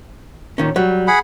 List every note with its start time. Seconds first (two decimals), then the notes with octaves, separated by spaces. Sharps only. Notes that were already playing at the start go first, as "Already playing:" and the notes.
0.58 A#2 D#3 C#4
0.76 F#3 G3
1.08 G#4 F#5 B5